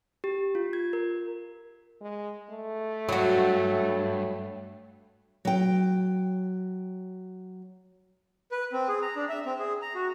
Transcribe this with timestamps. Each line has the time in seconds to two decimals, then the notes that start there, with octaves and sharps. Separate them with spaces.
0.24 G4
0.55 F4
0.73 G#6
0.93 A#4
2.01 G#3
2.50 A3
3.09 G2 F#3 F#4
5.45 F#3 G5
8.52 B4
8.73 C4
8.88 G#4
9.02 A#5
9.16 D4
9.29 E5
9.46 C4
9.59 G#4
9.82 A#5
9.95 F#4